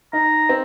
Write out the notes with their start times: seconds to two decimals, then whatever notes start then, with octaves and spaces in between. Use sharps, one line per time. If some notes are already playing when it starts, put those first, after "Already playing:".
0.13 D#4 A#5
0.49 C4